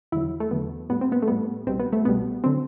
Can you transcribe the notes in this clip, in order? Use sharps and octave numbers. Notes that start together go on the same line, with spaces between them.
E2 D3 F#3 E4
A3
E2 D3 F#3 B3
A2 G3 B3
C4
B3
A3
A2 G3 B3
C2 B2 G3 C4
B3
A3
C2 B2 G3 B3
D3 F#3 C4